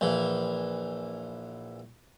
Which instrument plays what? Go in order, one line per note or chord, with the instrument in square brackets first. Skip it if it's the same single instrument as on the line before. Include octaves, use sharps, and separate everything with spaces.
[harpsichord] A#1 E3